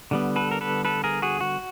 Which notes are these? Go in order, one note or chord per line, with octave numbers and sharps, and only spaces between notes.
D3 G3 B3
A4 B4
A#4
A4 B4
A4 B4
G#4 A#4
F#4 G#4
F#4